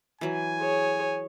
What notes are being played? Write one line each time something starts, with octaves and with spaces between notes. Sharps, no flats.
E3 F#3 G#5
G#4 C#5